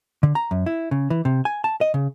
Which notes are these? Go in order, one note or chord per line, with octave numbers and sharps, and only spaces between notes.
D3
A#5
F#2
E4
C#3
E3
C3
G#5
A5
D#5
C#3